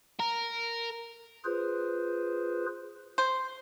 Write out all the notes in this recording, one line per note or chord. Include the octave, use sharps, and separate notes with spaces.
A#4
F4 G#4 B4 C5
C5